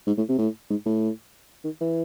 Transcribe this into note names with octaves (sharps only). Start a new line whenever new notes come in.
G#2
A2
C3
A2
G#2
A2
D#3
E3